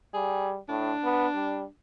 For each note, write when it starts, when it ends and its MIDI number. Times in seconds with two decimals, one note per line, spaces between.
0.14 0.58 55
0.14 0.52 68
0.69 0.93 45
0.69 1.69 62
1.04 1.27 59
1.35 1.63 55